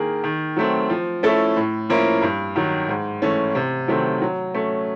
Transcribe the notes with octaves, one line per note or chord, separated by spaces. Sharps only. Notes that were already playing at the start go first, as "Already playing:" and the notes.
Already playing: D#3 A#3 G#4
D#3
F#3 A3 C4
F3
A3 C#4 E4 A4
A2
F3 A#3 C#4 E4
G2
D#3 F#3
G#2
E3 A3 C#4
C3
D#3 F#3 A3 C4
F#3
A3 C#4